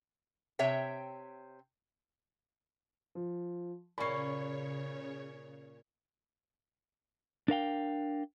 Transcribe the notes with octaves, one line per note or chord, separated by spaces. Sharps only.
C3 C#5 E5 G5
F3
A#2 C#3 C#4 C#5 B5 C#6 C7
D4 A#4 F5 G5